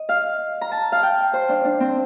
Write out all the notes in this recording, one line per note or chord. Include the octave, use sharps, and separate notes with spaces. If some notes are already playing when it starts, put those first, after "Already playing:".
Already playing: D#5
F5
A#5
A5
F5
G5
C5
D4
D4
C4